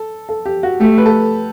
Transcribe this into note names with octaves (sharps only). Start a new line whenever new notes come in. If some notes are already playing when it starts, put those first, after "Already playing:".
Already playing: A4
A4
G4
F#4
A3 G4
B4
A4